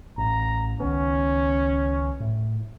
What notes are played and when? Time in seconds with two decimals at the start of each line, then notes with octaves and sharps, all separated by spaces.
0.18 A1 A#5
0.80 C#2 D#3 B3 C#4
2.20 A2